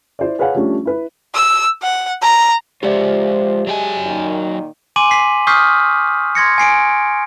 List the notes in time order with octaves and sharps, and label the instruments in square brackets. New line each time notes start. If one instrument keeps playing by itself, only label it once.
[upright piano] E4 C5 D5
G#4 B4 C#5 F5 F#5
F3 G3 A3 C#4 D4
E4 B4
[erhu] E6
F#5
A#5
[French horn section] F3 C5 [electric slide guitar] G#3 F4 [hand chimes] G4 D5 E5
[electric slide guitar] F#3 G5 G#5 [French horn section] G#3
[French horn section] A#2 D#3 D#4
[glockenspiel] G#5 C6 D6 D#7 F#7
B6 C7
C#6 D#6 F6 G6 B6 C7
C6 G#6 A#6 C#7
G#5 C7 D7